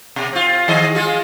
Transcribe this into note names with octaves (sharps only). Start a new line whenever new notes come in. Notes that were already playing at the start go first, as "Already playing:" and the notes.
B2
C4 F4
D#3 G#4 D#5
G#3 F4 G#4